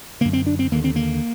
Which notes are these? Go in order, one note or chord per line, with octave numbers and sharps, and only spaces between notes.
F#2 D3 A#3
C4
D4
C4
D#2 D3 A#3
C4
A#3